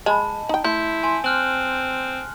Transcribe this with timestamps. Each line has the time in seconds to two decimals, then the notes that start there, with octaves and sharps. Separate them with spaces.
0.06 G#3 D#5 G#5 A5 B5
0.49 D#4 G5
0.65 A3 E4 C6 G6
1.03 G#5 C6
1.24 C4 F6 F#6 F#7